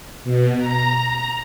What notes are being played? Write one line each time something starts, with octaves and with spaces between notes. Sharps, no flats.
B2
A#5